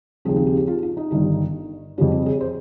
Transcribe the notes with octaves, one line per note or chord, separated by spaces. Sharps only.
D#2 C#3 F3 C4 G#4
G#4
G4
G4
F4
F4
D#4
G1 G2 D#3 G3
F2 C#3 G3 C#4 F4
G#4
G#4
C5